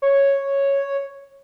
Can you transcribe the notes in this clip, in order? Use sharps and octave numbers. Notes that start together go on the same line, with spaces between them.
C#5